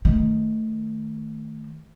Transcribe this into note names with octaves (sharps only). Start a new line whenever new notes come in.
D#3 A3